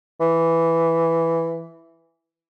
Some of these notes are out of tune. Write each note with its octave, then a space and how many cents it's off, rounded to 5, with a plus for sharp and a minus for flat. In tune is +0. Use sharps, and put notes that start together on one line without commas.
E3 +5